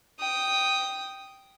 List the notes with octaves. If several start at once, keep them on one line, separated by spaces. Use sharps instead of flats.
G5 D#6